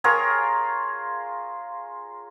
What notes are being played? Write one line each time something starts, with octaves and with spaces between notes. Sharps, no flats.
F4 G#4 A#4 C#5